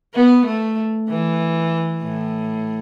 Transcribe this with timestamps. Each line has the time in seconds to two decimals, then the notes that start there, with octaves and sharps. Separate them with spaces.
0.14 B3
0.46 A3
1.09 E3
2.02 A2